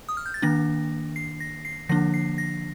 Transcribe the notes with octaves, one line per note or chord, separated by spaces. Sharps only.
D#6
F6
G6
A6
D#3 A#3 D4 A#6
C7
A#6
C7
D3 F3 A#3 D4 A#6
C7
A#6